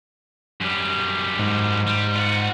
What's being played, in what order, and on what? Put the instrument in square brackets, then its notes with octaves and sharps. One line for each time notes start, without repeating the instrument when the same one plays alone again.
[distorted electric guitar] F#2 G3
[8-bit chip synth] G#2
[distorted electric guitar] G3
F4 F#5